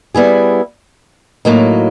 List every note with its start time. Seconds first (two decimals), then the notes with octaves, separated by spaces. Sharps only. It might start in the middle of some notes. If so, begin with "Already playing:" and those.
0.14 G3 B3 E4 G#4
1.45 A2 F#3 A#3 D#4